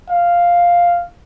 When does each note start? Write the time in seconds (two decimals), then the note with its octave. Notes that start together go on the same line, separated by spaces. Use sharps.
0.09 F5